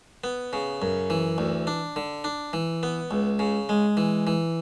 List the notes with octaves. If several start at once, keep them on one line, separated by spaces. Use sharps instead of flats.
B3
C#3
F#2
E3
D2
D4
D3
D4
E3
B3
C#2
C#3
G#3
E3
E3